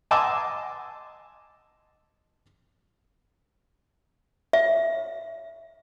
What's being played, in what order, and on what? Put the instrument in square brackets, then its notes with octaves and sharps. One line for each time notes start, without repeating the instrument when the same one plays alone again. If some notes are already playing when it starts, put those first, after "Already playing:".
[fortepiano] D#5 G#5 A5 C6 D6 E6
[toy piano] E5